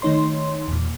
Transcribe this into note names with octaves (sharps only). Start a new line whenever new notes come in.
D#3 A3 D#4 C#5 C6
E2 A#2